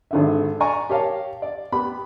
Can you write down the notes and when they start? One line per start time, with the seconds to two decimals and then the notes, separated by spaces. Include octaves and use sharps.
0.11 G#1 D3 E5
0.60 D5 G#5 A#5 C#6
0.90 G4 A#4 C#5 F5 A5
1.42 D5
1.72 B3 G4 B5